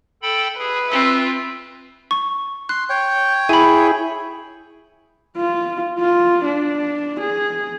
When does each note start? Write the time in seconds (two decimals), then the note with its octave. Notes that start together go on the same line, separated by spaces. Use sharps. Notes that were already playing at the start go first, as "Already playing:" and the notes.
0.22 A4 G5 B5
0.59 G#4 B4
0.91 C4 F4 E5
2.11 C#6
2.69 C6 F#6
2.90 C#5 G5
3.49 E4 G#4 G#5 B5
5.36 F4
5.99 F4
6.45 D4
7.21 G#4